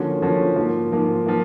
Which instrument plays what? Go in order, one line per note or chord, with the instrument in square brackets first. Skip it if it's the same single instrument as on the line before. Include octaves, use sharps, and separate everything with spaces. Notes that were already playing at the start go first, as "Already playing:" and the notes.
Already playing: [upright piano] D3 F3 A#3 C#4 F#4
D3 F3 A#3 C#4 F#4
G#2 F3 A#3
G#2 F3 A#3
F3 A#3